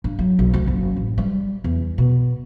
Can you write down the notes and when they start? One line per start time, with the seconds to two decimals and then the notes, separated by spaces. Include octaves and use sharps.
0.04 G2
0.19 F#3
0.39 B1
0.54 D2
0.67 F#1
0.97 A1
1.18 G3
1.64 E2
1.98 B2